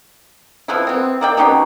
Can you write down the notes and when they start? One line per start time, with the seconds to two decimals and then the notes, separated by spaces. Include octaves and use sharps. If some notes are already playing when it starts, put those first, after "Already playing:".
0.68 F3 B3 E4
0.87 B3 C4
1.21 A#3 D5 G5
1.37 B2 C#4 D#4 G4